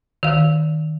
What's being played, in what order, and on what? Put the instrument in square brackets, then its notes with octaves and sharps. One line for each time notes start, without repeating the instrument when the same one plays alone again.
[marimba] D#3 F5